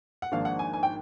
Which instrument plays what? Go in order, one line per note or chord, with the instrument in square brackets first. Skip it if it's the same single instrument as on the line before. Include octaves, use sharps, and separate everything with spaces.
[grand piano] F#5
G#1 G#2 F3 A#3 D4 F5
F#5
G#5
G#5
G5